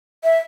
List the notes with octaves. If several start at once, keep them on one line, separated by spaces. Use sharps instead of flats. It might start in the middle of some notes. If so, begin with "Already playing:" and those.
E5